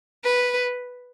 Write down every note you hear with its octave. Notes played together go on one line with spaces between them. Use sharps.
B4